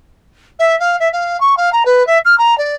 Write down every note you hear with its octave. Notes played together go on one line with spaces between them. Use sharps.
E5
F5
E5
F5
C#6
F5
A#5
B4
E5
F6
A#5
D5